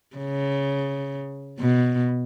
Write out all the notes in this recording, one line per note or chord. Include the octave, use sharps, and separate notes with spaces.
C#3
B2